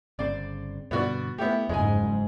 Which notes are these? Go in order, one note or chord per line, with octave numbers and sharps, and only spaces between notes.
G1 C#3 C4 D5
G2 B2 D3 B3 F#4 D5
A3 B3 E4 G4
F#1 F2 G#2 G#3 G#5